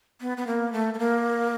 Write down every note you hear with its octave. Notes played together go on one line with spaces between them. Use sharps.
B3
B3
A#3
A3
A3
A#3